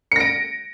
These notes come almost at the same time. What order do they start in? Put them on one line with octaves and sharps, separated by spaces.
C#7 A#6 D7